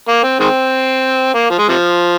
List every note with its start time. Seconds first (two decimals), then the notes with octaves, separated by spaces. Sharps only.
0.08 A#3
0.24 C4
0.40 D#3 G#3 C4
1.34 A#3
1.50 F3
1.59 G#3
1.69 C3 F3